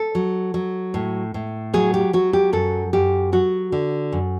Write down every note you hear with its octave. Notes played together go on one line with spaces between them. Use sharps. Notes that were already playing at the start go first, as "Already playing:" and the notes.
Already playing: A4
F#3
F#3
A2
A2
F#3 G#4
G4
F#3 F#4
G4
F#2 A4
F#2 G4
F#3 F#4
D3
F#2